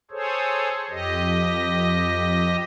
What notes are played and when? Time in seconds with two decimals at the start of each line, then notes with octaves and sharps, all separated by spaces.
0.11 G#4 A4 C5 C#5
0.90 F2 G4 D#5